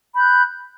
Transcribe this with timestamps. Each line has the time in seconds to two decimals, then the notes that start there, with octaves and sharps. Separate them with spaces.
0.15 B5
0.17 G6
0.20 F#6